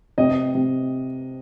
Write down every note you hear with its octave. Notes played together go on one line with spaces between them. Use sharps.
C3 D#5
C3